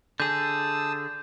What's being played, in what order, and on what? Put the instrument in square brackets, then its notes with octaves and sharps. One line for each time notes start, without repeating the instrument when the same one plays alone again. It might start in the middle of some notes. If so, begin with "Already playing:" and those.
[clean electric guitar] D3 G#4 [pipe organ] A5 D#6 E6 [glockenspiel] G6